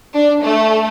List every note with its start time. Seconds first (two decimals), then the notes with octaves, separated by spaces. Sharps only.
0.14 D4
0.43 A3